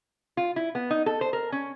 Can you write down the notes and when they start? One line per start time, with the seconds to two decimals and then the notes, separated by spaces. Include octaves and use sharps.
0.37 F4
0.56 E4
0.75 B3
0.91 D#4
1.06 A4
1.21 C5
1.33 A#4
1.52 C#4